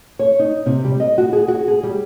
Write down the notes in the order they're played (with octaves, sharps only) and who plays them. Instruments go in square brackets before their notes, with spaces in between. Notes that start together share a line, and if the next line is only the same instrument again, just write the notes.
[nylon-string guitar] C#5
D#4
C3
G3
D#5
F#4
G#4
F#4
G#4
G3